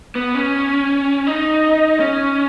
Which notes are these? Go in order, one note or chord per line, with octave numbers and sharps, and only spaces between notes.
B3
C#4
D#4
C#4